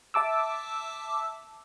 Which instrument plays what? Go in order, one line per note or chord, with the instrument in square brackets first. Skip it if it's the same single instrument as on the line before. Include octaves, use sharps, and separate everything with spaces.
[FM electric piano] E5 A5 D6 E6